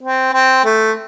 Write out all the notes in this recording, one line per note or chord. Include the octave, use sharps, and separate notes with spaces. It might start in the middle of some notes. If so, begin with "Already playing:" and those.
C4
C4
A3